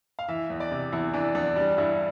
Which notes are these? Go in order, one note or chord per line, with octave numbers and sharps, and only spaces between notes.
F5
E3 E5
E2
D5
C3
E2 E4
E3 D4
E2 D4
G3 D4
G2 E4